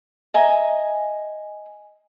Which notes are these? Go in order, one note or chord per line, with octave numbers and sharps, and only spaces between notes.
D#5 E5 G#5 A#5